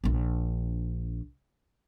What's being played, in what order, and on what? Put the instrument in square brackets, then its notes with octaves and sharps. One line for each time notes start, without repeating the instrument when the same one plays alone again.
[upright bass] A#1 D4